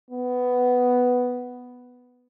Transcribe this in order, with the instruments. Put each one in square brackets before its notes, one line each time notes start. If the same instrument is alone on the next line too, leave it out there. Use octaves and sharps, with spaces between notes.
[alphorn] B3